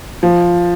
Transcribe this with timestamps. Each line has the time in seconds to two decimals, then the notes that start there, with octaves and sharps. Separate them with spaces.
0.23 F3